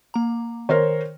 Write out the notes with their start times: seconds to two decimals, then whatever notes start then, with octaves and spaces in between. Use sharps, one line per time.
0.14 A#3 A#5
0.69 D#3 A#4 C5 C#5